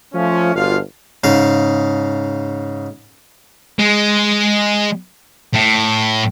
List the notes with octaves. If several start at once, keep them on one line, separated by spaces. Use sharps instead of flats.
F3 A3 C#4
G1 D4 F4 F#4 F5
G#2 C#3 F5
G#3
A2